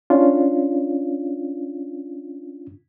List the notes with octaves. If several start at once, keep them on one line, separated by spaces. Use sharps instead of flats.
C#4 D4 F4